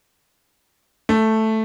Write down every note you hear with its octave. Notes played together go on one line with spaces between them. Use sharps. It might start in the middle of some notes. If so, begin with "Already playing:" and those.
A3